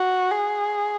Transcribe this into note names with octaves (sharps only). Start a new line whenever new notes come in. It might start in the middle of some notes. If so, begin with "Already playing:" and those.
Already playing: F#4
G#4